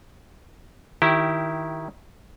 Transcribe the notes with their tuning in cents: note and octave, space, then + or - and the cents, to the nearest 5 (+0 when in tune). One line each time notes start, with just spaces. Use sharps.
D#3 +10 E4 +0 G4 -15